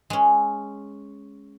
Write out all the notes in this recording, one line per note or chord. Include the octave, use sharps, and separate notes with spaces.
G#3 C#4